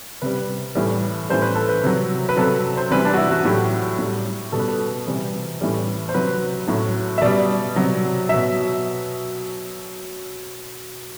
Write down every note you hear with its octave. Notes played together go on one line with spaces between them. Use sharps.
C3 G3 B4
A2 E3 G3
A2 E3 G3 C5
B4
A4
B4
C3 F#3
B4
C3 F#3 A4
C5
C3 E3 G3 B4
D4
F#4
E4
F#4
A2 F#3 G4
A2 G3
B2 G3 A4
B4
A4
C3 E3 G3
A2 E3 G3
C5
C3 F#3 B4
A2 F#3
E5
B2 G3 D5
C3 F#3
B2 F#3 E5